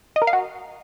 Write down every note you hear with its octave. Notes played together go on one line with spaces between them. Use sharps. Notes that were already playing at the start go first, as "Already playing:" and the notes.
D#5
A#4
F5
F#4